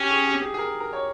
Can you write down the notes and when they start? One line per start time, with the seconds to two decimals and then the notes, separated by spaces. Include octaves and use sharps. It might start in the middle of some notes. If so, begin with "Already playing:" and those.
Already playing: C#4 G4
0.10 G#4
0.26 G4
0.42 G#4
0.54 G#4
0.58 A#4
0.80 A#4
0.93 C#5